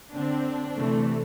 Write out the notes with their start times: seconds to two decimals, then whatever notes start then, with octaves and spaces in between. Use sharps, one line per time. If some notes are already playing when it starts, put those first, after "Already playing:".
0.14 D3 C4 D4
0.76 C3 E3 A3